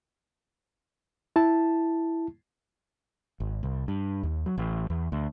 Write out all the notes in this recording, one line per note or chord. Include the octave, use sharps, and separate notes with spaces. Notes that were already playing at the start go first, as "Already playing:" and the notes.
E4 A5
G#1
C2
G2
D#2
F#3
A1
E2
D2